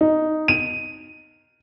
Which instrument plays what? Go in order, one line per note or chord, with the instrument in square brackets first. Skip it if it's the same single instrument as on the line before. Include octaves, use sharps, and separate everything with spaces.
[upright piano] D#4
D#7